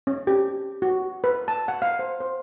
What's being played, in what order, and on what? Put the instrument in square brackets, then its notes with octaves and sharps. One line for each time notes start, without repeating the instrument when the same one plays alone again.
[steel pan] C#4
G4
F#4
B4
A5
F#5
F5
C5
C5